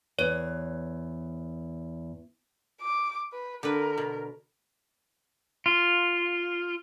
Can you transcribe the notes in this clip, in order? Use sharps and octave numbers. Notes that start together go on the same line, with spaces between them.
E2 C#5
D6
B4
D3 A#4 B4
B2
F4